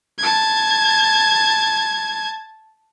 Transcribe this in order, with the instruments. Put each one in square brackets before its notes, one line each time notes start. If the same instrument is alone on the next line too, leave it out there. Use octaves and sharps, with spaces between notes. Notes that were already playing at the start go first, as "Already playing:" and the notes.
[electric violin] A5 G#6